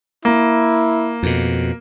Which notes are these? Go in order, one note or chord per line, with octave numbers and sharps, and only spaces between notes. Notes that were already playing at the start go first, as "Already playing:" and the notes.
A#3 E4
F2 B2